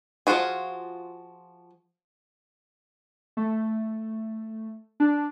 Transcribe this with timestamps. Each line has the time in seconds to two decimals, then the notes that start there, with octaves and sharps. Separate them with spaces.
0.27 F3 B3 F4 F#4 G#4
3.37 A3
5.00 D4